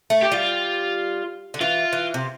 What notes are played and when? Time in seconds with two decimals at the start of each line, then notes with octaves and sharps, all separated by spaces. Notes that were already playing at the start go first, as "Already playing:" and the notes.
0.10 A3
0.22 G4
0.32 G3 F4
1.54 D3
1.61 E3 F4
1.93 E3
2.14 C3